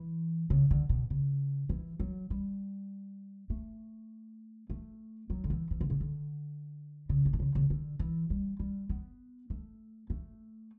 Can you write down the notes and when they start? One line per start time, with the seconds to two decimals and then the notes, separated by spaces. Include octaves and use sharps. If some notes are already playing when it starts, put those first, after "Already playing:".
Already playing: E3
0.50 C#3
0.71 D3
0.89 B2
1.10 C#3
1.69 E3
2.00 F#3
2.30 G3
3.50 A3
4.70 A3
5.30 F#3
5.44 D3
5.50 E3
5.71 E3
5.81 D3
5.90 C#3
6.00 D3
7.09 C#3
7.25 A2
7.33 B2
7.40 C#3
7.55 C#3
7.70 D3
7.99 E3
8.30 G3
8.59 G3
8.89 B3
9.50 A3
10.10 A3